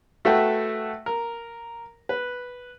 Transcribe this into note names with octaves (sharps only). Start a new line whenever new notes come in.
A3 F#4 A4 B4 E5 G5
A#4
B4